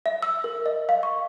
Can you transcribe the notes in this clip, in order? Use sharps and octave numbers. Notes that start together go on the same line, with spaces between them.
E5
E6
A#4
D#5
F5
C#6